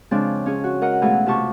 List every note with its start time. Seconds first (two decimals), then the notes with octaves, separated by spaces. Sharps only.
0.11 C#3 F3 G#3 C4 D4
0.46 C#4 G#4
0.64 F#4
0.81 A#4 D#5 F#5
1.02 B2 E3 G#3 A3 G#4 F5
1.26 C3 F4 G4 A5 C#6